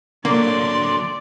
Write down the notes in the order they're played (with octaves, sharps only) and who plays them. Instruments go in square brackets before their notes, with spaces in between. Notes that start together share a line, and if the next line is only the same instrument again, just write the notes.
[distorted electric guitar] D3 F#3 [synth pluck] A#3 [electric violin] D5 [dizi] C6